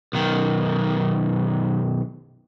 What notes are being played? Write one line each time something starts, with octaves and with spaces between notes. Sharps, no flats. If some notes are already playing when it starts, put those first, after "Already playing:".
B1 D#3